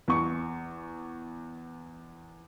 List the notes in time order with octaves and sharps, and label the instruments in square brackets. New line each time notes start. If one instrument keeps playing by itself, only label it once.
[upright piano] E2 C#6